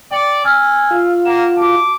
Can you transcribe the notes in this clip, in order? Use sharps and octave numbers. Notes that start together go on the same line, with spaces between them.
D5 G5 C#7
G#5 E6 F6
F4
A#3 F#5 E7
F#4 A5 D6